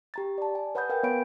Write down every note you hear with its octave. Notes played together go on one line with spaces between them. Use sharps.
G4 A#5 A6
D5 A5
G#5
B4 C#5 F#5 B5 D#6 G6
A#4 B4 F5 G5 G#5
B3 C#5 F5 B5 G6 D7